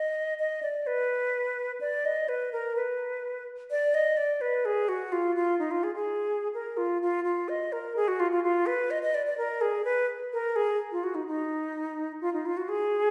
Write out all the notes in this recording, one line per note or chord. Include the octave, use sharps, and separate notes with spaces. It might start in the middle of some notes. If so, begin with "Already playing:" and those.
Already playing: D#5
D#5
D5
B4
D5
D#5
B4
A#4
B4
D5
D#5
D5
B4
G#4
F#4
F4
F4
D#4
F4
G#4
G#4
A#4
F4
F4
F4
D#5
A#4
G#4
F#4
F4
F4
F4
B4
D#5
D#5
D5
D5
A#4
G#4
B4
A#4
G#4
F4
F#4
D#4
D#4
F4
D#4
F4
F#4
G#4